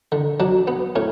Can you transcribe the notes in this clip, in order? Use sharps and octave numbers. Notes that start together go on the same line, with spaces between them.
D3
F#3 D4
B3
A2 C#4